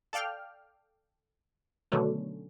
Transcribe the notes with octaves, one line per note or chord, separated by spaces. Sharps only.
A4 D5 F5 G5 F6
B2 D3 D#3 F#3 A3 C#4